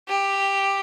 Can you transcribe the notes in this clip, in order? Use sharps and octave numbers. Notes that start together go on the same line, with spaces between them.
G4